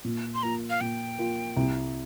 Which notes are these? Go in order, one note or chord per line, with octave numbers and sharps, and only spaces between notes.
A#2
C6
A#3 F4 A#5
F5
A#2 G5
A#3 F4
C2